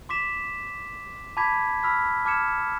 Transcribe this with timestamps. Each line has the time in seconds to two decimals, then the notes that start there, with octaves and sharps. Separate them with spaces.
0.09 C6 D6 B6 E7
1.37 A5 B5 D6 G#6 B6
1.83 B5 E6 F6 B6
2.25 A5 D6 F6 G#6 C#7 E7